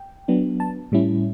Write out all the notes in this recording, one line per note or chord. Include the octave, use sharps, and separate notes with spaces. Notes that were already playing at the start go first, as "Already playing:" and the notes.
Already playing: G5
F#3 B3 D4
A5
A2 G3 C#4 E4